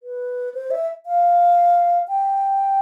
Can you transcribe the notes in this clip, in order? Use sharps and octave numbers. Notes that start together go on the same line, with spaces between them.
B4
C5
E5
F5
G5